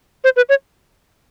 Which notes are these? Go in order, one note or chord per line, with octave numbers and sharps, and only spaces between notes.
C5
B4
C#5